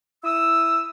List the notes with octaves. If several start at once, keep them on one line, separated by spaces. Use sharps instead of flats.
E4 D#6 E6